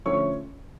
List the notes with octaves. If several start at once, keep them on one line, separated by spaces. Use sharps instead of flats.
D3 F3 A3 C#4 C#5 C#6